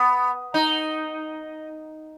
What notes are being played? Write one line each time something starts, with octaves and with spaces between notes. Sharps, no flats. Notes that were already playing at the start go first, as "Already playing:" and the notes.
Already playing: B3
D#4